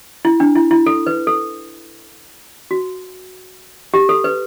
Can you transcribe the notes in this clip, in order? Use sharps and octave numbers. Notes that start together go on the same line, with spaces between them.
E4
D4
E4
E4
A4
B4
A4
F#4
G4
A4
B4